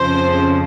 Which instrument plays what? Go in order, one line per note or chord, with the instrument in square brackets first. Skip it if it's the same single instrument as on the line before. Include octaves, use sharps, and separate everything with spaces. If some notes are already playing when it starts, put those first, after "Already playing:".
Already playing: [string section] F2 C#3 F3 C5